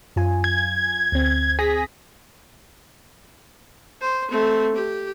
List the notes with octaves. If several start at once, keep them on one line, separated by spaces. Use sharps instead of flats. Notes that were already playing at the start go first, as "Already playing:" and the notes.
F#2 F4 G#5
G#6
D2 C4
G#4 A#6 B6
C5
A3 C4
G4